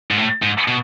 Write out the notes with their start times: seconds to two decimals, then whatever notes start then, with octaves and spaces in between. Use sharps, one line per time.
0.11 G#2
0.17 A2
0.42 G#2
0.68 B2